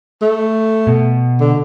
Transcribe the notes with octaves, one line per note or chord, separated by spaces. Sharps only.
A3
B2
D3